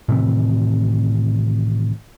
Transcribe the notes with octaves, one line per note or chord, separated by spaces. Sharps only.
A2 C3 D#3 E3